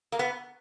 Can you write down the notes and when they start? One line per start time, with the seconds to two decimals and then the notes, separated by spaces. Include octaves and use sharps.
0.12 A#3
0.19 B3